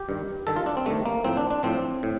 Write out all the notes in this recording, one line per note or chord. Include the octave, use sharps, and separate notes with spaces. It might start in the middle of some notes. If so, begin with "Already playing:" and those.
Already playing: G4
G2 D#3
G2 D#3 A4
F4
D4
C4
G2 D#3 A3
A#3
A2 F3 C4
D4
D4
A2 F3 C4
A2